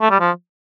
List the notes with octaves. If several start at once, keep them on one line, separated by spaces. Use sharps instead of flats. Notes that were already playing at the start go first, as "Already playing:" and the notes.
A3
G3
F3